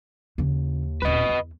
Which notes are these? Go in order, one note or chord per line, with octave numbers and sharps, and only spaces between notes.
D#2 C#3 E3
D#1 A1 B4 D#5
E2